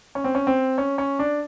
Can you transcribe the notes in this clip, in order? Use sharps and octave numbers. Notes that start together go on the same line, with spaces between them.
C#4
C4
C#4
C4
C#4
C#4
D4